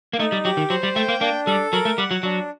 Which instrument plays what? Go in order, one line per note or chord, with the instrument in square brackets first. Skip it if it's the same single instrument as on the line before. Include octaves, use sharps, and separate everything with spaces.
[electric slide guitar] A#3
[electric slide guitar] A3 [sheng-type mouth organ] D#4
[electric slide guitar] G3
[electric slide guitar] F#3 [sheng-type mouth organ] G4
[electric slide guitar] D#3
[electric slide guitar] F#3 [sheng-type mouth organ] C5
[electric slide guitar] G3
[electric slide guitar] A3 [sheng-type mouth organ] G5
[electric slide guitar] A#3
[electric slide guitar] A#3 [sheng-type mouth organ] D4
[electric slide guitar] G3 [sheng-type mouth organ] A4
[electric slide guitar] F#3 [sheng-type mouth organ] A#4
[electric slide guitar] A3
[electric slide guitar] G3 [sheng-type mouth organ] F#5
[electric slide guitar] F#3
[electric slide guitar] F#3 [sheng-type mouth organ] D4